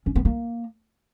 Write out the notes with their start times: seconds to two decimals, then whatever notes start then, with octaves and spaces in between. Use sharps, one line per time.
0.06 C#4
0.16 B3
0.25 A#3